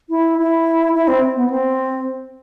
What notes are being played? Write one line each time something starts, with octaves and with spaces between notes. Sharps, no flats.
E4
E4
E4
C4
B3
C4